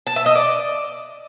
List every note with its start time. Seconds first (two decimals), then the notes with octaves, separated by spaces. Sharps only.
0.07 A5
0.16 E5
0.26 D#5
0.35 D5